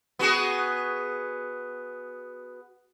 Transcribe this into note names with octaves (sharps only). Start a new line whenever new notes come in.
B3 F#4 G#4